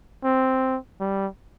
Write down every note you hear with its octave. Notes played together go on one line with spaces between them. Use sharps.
C4
G3